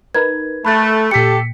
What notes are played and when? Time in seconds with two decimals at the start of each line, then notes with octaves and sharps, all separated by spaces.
0.14 D#4 A#4 B4 G#6
0.65 A3 B5 F#6 A6
1.11 A#2 G4 A4 G5 B6 C#7